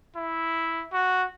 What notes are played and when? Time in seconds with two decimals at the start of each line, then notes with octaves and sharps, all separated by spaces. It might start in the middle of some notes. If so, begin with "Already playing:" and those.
0.16 E4
0.93 F#4